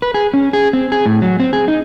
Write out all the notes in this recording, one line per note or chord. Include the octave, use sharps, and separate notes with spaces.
B4
G#4
C#4
G#4
C4
G#4
A2
F#3
C4
G#4
D#4